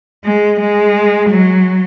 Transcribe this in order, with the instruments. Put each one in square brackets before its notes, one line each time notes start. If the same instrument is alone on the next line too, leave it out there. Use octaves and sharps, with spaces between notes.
[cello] G#3
G#3
F#3